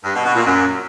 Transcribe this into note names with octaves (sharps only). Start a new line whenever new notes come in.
G2
B2
B2
A#2
F#2